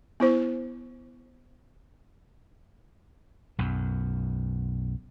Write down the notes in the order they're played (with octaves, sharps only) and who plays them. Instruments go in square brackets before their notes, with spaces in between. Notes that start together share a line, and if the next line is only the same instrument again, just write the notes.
[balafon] B3 E4 C5
[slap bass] B1 F#2